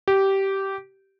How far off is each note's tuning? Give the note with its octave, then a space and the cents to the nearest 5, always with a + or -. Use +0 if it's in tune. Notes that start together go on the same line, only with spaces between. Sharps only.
G4 -15